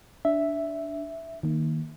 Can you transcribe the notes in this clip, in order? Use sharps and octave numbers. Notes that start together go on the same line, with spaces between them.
D4 E5
D#3 A#3